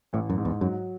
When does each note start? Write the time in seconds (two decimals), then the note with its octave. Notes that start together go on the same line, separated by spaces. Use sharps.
0.13 A1 A2
0.30 F#2
0.38 G#2
0.45 E2
0.61 F#2 F#3